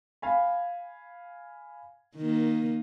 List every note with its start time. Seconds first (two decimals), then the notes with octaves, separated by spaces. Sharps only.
0.22 F5 G#5 B5
2.16 D#3 A#3